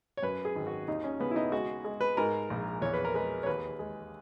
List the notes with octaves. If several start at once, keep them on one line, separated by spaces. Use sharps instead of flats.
C#5
F#2 B4
G#4
G#1
F#4
D#2 D#4
C#4
C#3 B3
E4
D#4
G#3 F#4
G#3
B4
G#2 A#4
A#1
E2 C#5
B4
A#4
G#3 B4
C#5
D#2 B4
G#3